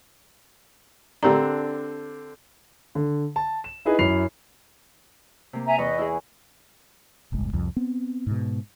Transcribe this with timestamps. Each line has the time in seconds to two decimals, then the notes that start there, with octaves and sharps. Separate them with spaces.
1.23 D3 C4 D4 G4 A#4 A#5
2.95 D3
3.36 A5
3.64 E7
3.85 D#4 E4 G#4 B4 D#5
3.99 F#2 E4 B5 C7 F7
5.53 C3 A#3
5.66 E5 G#5 A#5
5.78 E2 B4 D#5 C#6
5.99 E4 G#4
7.32 D1 G1 C2 G#3
7.53 C2 F2
7.77 B3 C4
8.27 G#2 B2